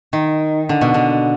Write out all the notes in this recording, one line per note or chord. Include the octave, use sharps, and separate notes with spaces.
D#3
D3
B2
D3